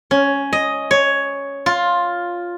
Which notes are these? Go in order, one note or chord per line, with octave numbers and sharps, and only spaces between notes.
C#4
D#5
C#5
F4